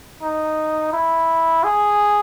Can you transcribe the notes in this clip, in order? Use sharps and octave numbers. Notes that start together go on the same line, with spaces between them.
D#4
E4
G#4